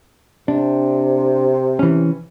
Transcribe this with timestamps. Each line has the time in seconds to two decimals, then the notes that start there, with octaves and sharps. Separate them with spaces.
0.48 C3 D4
1.79 E3 C#4